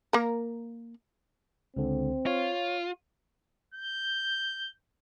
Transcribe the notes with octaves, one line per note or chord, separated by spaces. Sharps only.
A#3 A#4
C#2 D3 C4
F4 C#5
G6